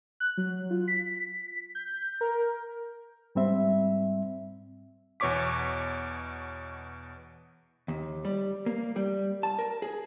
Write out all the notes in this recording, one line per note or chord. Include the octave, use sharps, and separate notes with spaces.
F#6
F#3
F4
B6
G6
A#4
G#2 G3 C4 E5
E2 B2 C#5 C#6 D6 B6
D#2
G3
A#3
G3
A5
A#4
G#4